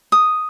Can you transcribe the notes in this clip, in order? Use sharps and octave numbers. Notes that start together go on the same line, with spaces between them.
D#6